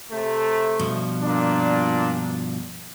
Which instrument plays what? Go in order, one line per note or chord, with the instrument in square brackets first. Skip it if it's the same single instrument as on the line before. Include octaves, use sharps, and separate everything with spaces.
[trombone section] C3 A3
[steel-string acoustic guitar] G2 B2 F3
[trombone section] A#2 D4